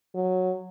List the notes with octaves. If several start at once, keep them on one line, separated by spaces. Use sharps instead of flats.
F#3